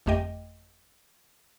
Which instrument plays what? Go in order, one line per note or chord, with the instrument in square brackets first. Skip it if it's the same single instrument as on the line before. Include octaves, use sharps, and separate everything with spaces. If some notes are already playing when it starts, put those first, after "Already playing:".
[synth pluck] G1 F2 A3 G4 D#5 G5